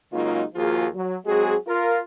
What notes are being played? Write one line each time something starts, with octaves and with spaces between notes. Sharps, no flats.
C#3 F#3 G#3 A#3 D#4 F4
D#2 F3 A#3 F4 F#4 G#4
F#3
F#3 G#3 C4 F#4 G#4
F4 A#4